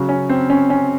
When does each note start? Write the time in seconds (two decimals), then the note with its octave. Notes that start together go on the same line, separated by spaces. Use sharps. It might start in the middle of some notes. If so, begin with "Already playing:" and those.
Already playing: C#3 F#3
0.09 C#4
0.29 C4
0.50 C#4
0.70 C#4